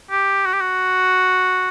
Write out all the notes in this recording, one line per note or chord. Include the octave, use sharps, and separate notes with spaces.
G4
F#4
G4
F#4